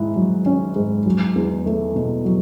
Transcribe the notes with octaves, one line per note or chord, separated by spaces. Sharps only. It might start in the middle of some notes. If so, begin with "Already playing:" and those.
Already playing: G#2 E4
F#3
C#4
G#2
F#3
E2
A3
B2
F#3